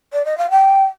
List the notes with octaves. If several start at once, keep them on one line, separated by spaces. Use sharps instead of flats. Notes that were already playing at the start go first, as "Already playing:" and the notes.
D5
D#5
F5
G5